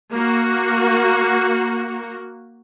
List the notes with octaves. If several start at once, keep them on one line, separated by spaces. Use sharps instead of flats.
A#3 F#4